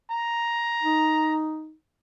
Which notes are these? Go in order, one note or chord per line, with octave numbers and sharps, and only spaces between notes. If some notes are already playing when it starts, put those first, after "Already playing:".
A#5
D#4